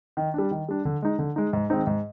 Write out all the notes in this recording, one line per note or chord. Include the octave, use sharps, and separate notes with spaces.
D#3
G3 D4
D#3
G3 D4
D3
G#3 D#4
D3
G#3 D#4
G#2
D#3 G#3 C4 D#4
G#2